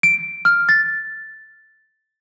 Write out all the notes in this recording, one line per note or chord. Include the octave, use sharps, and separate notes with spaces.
D7
F6
A6